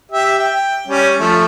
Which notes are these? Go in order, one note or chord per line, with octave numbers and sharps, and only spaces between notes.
G4 E5
G5
G3 C#4
F3 A3